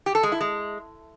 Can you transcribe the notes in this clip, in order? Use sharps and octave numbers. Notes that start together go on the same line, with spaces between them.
G4
A4
G#3
E4
G#3